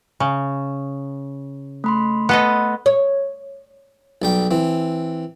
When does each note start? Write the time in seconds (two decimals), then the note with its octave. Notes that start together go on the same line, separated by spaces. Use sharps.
0.20 C#3
1.84 A3 B5 C6
2.29 B3 A4 D#5
2.86 C#5
4.22 B1 G3 G5
4.51 E3 C4